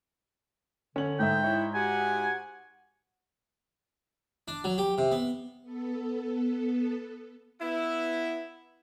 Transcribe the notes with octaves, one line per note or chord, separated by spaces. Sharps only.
D3 C#4 F#7
G#2 G#3 E5 G5
E4 C#5
F#4 G4 F#5 G#5
D4
F#3
G4
C3
B3
B3 A4
B3 E4